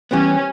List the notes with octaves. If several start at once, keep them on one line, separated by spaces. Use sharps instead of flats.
E3 G3 B3 C#4